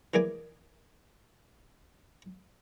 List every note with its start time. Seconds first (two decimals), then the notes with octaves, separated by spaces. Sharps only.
0.14 E3 A#3 G#4 D5 G#5